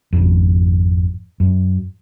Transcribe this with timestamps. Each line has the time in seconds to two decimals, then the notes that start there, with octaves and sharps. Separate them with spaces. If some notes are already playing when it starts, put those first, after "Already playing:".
0.13 G#1 F2
1.40 F#2